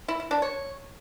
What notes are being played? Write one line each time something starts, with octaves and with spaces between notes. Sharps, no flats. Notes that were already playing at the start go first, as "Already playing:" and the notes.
E4
E4
D4
C#5